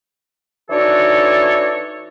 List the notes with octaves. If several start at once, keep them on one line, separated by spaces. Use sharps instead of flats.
E3 D4 D#4 F#4 A4 C#5